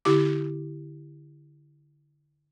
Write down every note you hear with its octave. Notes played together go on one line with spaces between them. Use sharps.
D3 E4 G4 D6